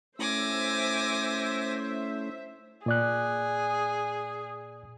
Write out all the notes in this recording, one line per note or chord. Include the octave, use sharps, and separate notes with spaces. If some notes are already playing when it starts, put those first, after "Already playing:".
A3 C#4 E4 C5 E5 G#5 D6 A#6
A#2 G#4 D5 F#6